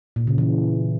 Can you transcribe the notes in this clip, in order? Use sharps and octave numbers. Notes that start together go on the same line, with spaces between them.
A#2
C#3
E3